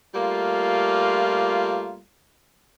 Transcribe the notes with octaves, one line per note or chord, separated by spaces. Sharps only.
G3 A3 A#3 F4